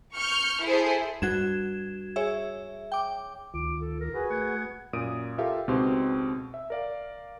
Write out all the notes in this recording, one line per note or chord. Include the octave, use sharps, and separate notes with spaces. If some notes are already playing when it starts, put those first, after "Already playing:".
C#6 F6 G6
E4 G#4 A4 C5
G2 F#4 G#6 E7
G#4 C#5 E5
G5 D6
D2 D#3 F4 D6
A4
A#4
F#4 G#4 B4
A3 F#5 G#6
F#2 A#2 D#6 D7 D#7
F4 G4 A4 A#4 E5 F5
C#2 B2 C4 D#4 G4 C6
E5
A#4 D5 F5